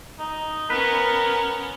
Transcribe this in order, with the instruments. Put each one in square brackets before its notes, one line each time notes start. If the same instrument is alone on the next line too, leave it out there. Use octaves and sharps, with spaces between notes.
[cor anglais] D#4
[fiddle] B3 C#4 [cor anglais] A#4 [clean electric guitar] B4